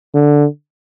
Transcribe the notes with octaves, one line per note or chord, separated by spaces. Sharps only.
D3